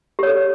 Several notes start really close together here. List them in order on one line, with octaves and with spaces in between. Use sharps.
G4 C#5 A4